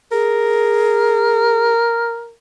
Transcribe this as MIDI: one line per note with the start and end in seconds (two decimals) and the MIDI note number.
0.12 1.72 68
0.12 2.32 70